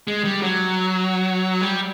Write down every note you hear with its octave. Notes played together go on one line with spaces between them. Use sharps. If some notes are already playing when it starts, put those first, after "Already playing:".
G#3
G3
F#3
G3